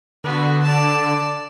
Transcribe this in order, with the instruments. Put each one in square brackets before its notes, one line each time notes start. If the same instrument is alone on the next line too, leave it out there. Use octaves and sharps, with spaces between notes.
[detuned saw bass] D3 [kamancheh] B3 F#4
[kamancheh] D5 A5